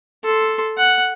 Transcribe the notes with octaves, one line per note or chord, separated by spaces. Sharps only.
A4 C6
F#5